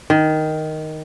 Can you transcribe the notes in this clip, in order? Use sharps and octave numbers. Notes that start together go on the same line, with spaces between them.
D#3